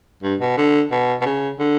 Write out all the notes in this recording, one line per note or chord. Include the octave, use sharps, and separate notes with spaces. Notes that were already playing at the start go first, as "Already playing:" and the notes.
G2
B2
D3
B2
B2
C#3
D3